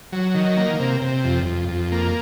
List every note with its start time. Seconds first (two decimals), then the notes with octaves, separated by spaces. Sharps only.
0.12 F#3
0.35 D#3
0.57 A#3
0.80 C3
1.01 C3
1.24 F2
1.46 F2
1.69 F2
1.92 A#3